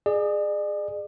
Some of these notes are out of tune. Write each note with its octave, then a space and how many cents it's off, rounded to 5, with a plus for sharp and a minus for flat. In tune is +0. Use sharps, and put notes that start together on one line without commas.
G#4 +0 D5 +40